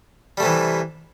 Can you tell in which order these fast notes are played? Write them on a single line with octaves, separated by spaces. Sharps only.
G3 A3 C3 E3